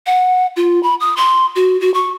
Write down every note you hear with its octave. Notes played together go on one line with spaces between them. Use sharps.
F#5
F4
B5
D#6
C6
F#4
F#4
C#6